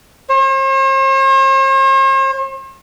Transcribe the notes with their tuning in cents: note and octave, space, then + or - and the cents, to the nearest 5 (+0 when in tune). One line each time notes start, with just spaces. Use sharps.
C5 +45